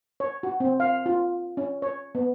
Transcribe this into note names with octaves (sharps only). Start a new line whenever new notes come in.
C#5
F#4
C4
F5
F4
C#4
C#5
B3